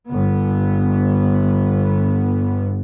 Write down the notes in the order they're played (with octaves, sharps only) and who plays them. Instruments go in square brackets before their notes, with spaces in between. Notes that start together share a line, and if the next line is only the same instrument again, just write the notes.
[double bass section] G1 B3